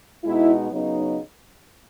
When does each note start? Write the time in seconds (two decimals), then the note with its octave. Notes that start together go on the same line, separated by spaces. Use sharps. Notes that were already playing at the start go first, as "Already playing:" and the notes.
0.24 B2 G#3 B3 D#4 E4
0.70 C#3 F#3 B3 D#4